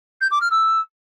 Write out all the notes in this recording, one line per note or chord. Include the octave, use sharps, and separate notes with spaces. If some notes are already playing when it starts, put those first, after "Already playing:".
G6
D6
F6
E6